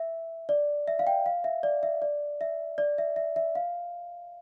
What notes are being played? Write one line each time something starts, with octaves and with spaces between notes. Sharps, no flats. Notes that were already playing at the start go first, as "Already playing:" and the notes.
Already playing: E5
D5
E5
F5
G5
F5
E5
D5
E5
D5
E5
D5
E5
E5
E5
F5